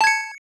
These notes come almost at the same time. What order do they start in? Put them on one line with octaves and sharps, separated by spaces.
A5 G#6 C#7